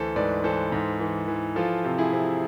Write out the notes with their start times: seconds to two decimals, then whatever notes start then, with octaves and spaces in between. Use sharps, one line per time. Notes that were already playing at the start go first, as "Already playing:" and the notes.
Already playing: D2 E3 A4 C5
0.16 G#2 B4 D5
0.44 E3 A4 C5
0.72 G#2
1.00 E3
1.28 E3
1.56 F3 F4 A4
1.85 C3
1.98 E4 G#4
2.13 C3